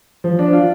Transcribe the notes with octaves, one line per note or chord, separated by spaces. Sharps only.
F3
D4
F4